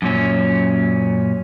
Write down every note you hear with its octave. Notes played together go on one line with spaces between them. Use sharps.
F#2 A#2 C#4